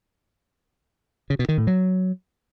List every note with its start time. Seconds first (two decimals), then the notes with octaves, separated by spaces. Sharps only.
1.30 C#3
1.39 B2
1.49 D#3
1.58 A2
1.67 F#3